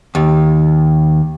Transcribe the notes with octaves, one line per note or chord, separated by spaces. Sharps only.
D#2